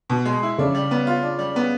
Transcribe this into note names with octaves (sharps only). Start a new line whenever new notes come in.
B2
G#3
E4
C#3 D4
G3
B3
F4
D4
G3
B3